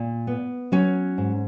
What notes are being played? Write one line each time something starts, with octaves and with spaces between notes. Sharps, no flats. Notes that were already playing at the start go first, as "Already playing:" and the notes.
Already playing: A#2
B3
F#3 C#4
G#2